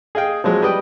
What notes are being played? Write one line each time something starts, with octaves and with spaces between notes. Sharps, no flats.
G#4 D#5 F5 G5
F3 F#3 G#3 C4
G3 B4 D#5 G5